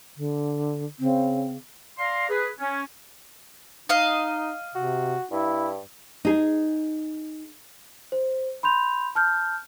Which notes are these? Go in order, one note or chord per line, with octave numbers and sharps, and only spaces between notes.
D3
C#3 C4
D5 F5 A#5 C6
G#4 B4
C#4
D#4 D#5 F5
C3 F#4
G2 E4
D#4 G#4
C5
B5 C6 G6 F7
A5 F6 G6